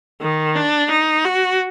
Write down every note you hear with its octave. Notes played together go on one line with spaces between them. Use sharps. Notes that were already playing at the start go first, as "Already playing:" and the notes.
D#3
D4
D#4
F#4